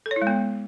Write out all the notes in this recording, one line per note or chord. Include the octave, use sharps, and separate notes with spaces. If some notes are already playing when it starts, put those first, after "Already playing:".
A4
C#5
E4
G#3
B3